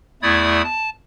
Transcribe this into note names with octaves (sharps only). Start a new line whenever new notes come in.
E2 A3 E4 D5 D#6 G#6
A5